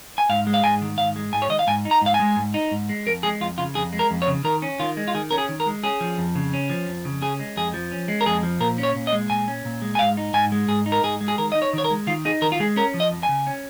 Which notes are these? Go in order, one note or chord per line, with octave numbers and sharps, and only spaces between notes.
G#5
G#2 F5
G#3
F5
G#2 G#5
D#3
G#2 F5
G#3
G#2 G#5
C#5
D#3 D#5
F5
G#2 G#5
D#4
A#5
G#2 F5
G#5
G#3
G#2
D#4
G#2
G#3
F2 A#4
G#3 G#4
F2 F4
C#3 F4
F2 G#4
G#3
A#4
F2
C#5
C#3
D#3 A#4
C#4
D#3 F4
G#3
F4
D#3 G#4
C#4 A#4
G#4
D#3
A#4
G#3
C#4 G#4
F3
F2
C#3
C#4
F3
F2
C#3
C#4 G#4
G#3
F2 G#4
F3
C#4
G#3
A#4
F2 G#4
F3
A#2 A#4
C#4
C#5
A#2
D#5
G#3
A#2 G#5
C#4
A#2
G#3
G#5
G#2 F5
D#4
G#2 G#5
G#3
G#2 G#4
D#4
A#4
G#2 G#4
G#3
G#4
D#3 A#4
D#4 D#5
C#5
D#3 C#5
A#4
G#3
D#3 F4
D#4 G#4
D#3 A#4
F4
G#3 G#4
C#4 A#4
F3
D#5
F2
G#5
C#3
C#4